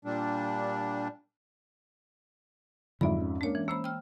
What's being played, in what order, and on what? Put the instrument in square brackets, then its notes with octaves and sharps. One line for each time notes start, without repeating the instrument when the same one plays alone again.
[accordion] A#2 G3 D4
[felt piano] F2 G#2 E5 [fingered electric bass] D3 F#3 G3 [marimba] D5 B5
[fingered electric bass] C#4
[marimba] G#3 C#5 [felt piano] A#3 D4
[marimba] E3
[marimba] A#3 C5 B5 [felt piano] E6
[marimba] G5 F6